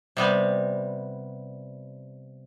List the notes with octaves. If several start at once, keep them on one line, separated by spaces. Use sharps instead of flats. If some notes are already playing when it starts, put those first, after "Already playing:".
C3 G3 B3